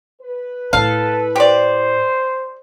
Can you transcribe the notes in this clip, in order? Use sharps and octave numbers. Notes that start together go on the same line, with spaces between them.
B4
A2 E4 A4 F5
G4 C5 D5